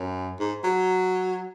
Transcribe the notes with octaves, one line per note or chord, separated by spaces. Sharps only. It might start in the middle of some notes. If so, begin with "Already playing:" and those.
Already playing: F#2
G#2
F#3